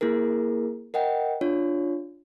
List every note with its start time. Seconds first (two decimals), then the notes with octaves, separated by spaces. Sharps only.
0.01 A#3 E4 G#4 A#4
0.94 A#4 D#5 F#5 G5
1.41 D4 F4 C#5